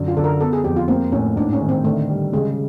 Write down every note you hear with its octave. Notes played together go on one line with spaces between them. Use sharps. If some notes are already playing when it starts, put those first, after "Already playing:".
Already playing: F#2 D3
F4
D3 A4
A#4
B3 A4
G#4
F2 G4
F4
A#3 C4
A2 C#4
G#2 D4
C#4
D#3
C4
D3 A3
G3
C#3 G#3